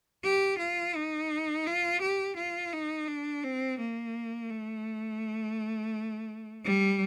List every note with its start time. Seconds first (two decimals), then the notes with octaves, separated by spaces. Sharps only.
0.24 G4
0.58 F4
0.95 D#4
1.66 F4
2.01 G4
2.37 F4
2.73 D#4
3.08 D4
3.44 C4
3.79 A#3
4.51 A3
6.65 G3